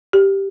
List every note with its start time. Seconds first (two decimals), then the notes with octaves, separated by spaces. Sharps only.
0.13 G4